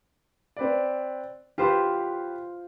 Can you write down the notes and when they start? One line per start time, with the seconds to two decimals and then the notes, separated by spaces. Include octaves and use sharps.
0.57 C4 B4 D5
1.58 F4 G4 B4 C5 F5